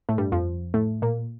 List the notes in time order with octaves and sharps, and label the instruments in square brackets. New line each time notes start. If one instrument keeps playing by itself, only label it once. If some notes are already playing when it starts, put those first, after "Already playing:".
[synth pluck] A2 A3
G2 G3
F2 F3
A2 A3
A#2 A#3